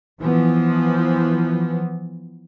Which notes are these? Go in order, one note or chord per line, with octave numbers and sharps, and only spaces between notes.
E3 F3 B3